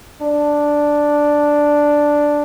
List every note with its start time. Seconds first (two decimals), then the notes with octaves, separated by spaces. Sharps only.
0.22 D4